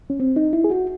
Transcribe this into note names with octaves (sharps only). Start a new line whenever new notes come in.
C#4
C4
D#4
E4
G#4
F#4